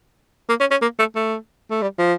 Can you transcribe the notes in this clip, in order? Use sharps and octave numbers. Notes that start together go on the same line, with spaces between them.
A#3
C#4
C#4
A#3
A3
A3
A3
G3
F3